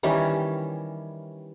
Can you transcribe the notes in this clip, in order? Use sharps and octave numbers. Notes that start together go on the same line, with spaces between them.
D#3 E3 G3 C#4